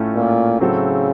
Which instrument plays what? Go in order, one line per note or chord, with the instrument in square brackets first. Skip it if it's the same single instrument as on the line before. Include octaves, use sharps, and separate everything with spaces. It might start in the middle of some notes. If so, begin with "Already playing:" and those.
Already playing: [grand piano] A2 A3 C#4 F4 A4
[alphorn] A#2
[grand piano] A2 F#3 C4 F#4 A4 [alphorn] C#3